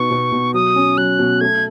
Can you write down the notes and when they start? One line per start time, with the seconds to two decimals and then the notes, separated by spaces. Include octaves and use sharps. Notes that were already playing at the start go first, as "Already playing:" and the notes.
Already playing: B2 B3 D#4 C#6
0.11 B2
0.32 B2
0.54 F#3 D#6
0.76 C#4
0.98 F#3 F#6
1.19 B2
1.41 A3 G#6